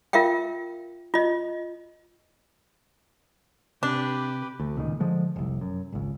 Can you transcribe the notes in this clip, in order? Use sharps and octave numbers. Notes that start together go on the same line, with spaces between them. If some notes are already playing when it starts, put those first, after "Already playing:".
F4 A#4 E5 F5 G5
F4 D#5
C3 D4 G4 B4
D2
D1 C#2 A#2 D#3
D3 F3 G#3
F1 C2
F#2
G#1 C#2